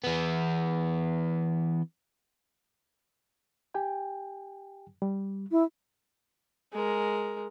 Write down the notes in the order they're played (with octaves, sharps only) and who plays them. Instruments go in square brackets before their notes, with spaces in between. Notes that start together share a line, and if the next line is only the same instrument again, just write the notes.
[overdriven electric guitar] E3 B3
[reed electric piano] G4 G5 G#5
G3
[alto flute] E4
[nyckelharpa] G#3 A#4